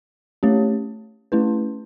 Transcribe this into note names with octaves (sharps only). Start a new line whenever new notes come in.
A3 C#4 G4 C#5
A3 C#4 E4 B4